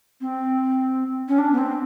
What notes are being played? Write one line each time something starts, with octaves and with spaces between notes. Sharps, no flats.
C4
C#4
D4
B3
C4